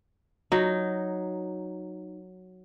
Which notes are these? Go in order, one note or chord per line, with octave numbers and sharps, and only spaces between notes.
F#3 D#4